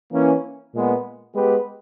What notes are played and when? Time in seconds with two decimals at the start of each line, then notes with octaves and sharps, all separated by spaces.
0.12 E3 A#3 C#4 E4
0.73 A#2 G#3 B3
1.34 G#3 B3 G4 B4